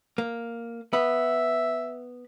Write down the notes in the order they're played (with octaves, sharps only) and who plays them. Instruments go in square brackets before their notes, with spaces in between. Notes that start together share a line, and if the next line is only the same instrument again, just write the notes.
[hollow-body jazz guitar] A#3
[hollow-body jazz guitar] B3 [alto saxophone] E5